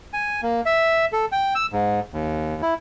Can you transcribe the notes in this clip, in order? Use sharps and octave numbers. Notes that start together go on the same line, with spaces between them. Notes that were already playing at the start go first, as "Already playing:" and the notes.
G#5
A#3
E5
A4
G5
E6
G#2
D#2
E4